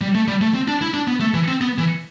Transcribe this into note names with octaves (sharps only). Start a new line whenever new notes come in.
G3
A3
G3
A3
C4
D4
E4
D4
B3
A3
E3
C4
B3
E3